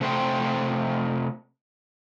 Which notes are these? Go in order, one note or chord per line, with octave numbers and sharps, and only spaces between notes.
C3 A3 C5 G5